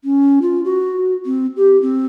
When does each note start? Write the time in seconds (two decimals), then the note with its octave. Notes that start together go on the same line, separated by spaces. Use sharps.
0.04 C#4
0.42 F4
0.65 F#4
1.26 C4
1.57 G4
1.82 C4